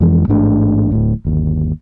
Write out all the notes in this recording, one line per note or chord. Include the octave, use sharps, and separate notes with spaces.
F2 E3 G#3
A1 G#2 A3 D4
D1 A2
G1 D#2